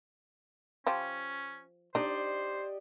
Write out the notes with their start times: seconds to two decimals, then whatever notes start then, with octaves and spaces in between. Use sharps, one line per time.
0.86 F3 C#4 F4 G4
1.95 D4 D#4 G4 C5 D5 D#5